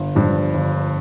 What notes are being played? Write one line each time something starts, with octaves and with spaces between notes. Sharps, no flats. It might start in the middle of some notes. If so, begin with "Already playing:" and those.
Already playing: G1
G2 F3
G1